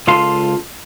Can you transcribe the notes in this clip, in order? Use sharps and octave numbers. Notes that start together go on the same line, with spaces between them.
C#2 F4 A4 F5 C6